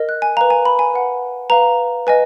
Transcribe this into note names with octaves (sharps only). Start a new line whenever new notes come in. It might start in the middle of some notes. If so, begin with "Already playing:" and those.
Already playing: A#4 D#5
F#6
G#5
B4 F5 A#5
G#5
B5
G#5
B4 F#5
B4 F5 A#5
B4 D#5 G#5